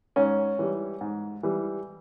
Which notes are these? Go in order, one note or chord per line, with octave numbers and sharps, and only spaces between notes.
G#2 C#4
E3 G3
G#2
E3 G3